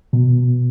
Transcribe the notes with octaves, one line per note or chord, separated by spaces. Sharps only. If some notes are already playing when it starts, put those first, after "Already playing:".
B2